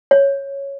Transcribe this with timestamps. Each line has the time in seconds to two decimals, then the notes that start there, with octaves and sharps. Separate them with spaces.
0.11 C#5